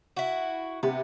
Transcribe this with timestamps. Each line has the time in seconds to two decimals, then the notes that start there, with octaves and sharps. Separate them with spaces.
0.17 E4 F#4
0.83 C3 B3